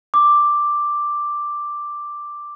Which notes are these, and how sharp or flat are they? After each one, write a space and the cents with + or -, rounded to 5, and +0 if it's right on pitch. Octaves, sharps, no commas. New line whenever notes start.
D6 +5